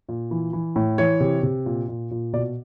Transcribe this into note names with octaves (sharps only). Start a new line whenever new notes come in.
A#2
E3
E3
A2
E3 C#5
C3
C3
A#2
A#2
A#2
B2 D5